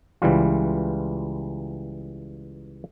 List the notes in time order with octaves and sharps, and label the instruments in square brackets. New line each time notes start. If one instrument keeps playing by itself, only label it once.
[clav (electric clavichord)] C#2 E3 G3 F4